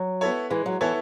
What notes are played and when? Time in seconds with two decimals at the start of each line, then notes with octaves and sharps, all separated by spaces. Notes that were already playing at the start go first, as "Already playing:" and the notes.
Already playing: F#3
0.21 B3 E4 A4 C#5
0.50 E3 G#3
0.66 F#3
0.81 E3 B3 E4 A4 C#5